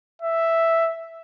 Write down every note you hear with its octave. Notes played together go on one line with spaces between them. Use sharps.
E5